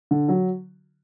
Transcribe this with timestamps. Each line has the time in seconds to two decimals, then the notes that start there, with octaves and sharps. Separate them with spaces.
0.11 D3
0.29 F#3